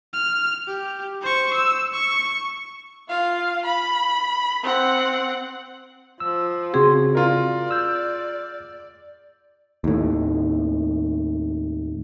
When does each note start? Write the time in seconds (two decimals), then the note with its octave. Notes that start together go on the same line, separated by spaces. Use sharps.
0.14 F6
0.68 G4
1.22 C5 C#6
1.54 E6
1.94 C#6
3.08 F4 F5
3.65 B5
4.63 C4 F#5
6.20 F3 E6
6.74 C#3 C4 F#4 G#4 C6
7.15 F4 A#4 D5
7.71 E6 G6
9.84 D#2 A2